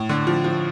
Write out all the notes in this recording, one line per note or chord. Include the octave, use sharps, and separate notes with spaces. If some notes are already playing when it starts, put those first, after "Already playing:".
Already playing: A2
D3
F3
F3